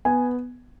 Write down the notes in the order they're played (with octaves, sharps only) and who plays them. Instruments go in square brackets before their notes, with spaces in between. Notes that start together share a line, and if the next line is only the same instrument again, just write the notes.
[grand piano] B3 G#5